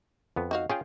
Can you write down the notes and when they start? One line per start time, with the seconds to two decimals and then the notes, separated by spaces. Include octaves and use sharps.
0.36 F2 B3
0.51 D#4 F#4 F5
0.70 C#4 F4 G#4 G5